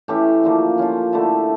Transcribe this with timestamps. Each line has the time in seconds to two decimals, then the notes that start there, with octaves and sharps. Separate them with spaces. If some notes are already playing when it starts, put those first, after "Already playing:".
0.08 E3 A3 C#4 G4
0.43 D3 F3 A#3
0.78 F3 C#4 F4
1.12 D3 A3 E4 A4